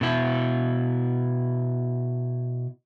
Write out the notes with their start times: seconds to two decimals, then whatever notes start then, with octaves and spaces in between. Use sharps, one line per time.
0.01 B2 E4